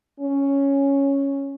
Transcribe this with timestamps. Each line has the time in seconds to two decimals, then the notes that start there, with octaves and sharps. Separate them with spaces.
0.20 C#4